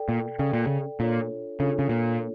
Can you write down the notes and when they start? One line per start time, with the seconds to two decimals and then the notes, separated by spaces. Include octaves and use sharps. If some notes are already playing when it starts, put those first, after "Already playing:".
Already playing: A4 D5 G5
0.09 A#2
0.39 C#3 A4 D5 G5
0.53 A#2
0.67 C#3
1.00 A#2 D4 F4 A4 C#5
1.60 C#3 D4 F4 A4 C#5
1.79 C#3
1.89 A#2